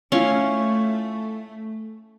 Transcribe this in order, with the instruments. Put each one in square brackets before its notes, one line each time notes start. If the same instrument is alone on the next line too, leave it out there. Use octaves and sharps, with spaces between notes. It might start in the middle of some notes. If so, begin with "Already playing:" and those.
[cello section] A3 [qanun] C#4 [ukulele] E4 F4 C#5